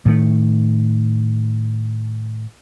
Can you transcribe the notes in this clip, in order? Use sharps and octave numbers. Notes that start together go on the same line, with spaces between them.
A2 D#3 A3